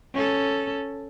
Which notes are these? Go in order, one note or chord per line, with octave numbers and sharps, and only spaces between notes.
C#4 A4